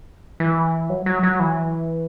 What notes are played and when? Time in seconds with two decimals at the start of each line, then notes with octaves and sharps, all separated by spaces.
0.40 E3
0.89 F#3
1.06 F#3
1.23 F#3
1.39 E3